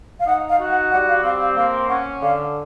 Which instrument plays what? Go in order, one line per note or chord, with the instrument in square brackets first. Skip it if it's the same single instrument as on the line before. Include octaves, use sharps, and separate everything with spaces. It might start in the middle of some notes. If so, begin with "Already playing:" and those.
[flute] F5
[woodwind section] D#4 [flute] F#5
[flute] F5
[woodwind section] F#4
[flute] F#5
[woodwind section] G3 [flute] F#5
[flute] F5
[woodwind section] C4 [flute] F5
[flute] F5
[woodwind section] A#3 [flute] F5
[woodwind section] C#4 [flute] F#5
[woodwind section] D3 [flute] F5